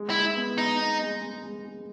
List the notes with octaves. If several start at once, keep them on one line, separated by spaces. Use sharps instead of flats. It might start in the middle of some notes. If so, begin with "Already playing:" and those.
Already playing: G#3
E4
G#3
B3
B3 D#4
B3
G#3
G#3
G#3
G#3